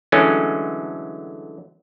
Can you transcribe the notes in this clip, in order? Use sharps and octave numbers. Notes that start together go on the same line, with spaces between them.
D3 E3 F#3 G#3 A3 C#4